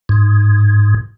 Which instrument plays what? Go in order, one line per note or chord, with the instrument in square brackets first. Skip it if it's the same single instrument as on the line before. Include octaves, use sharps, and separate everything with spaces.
[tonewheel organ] G#2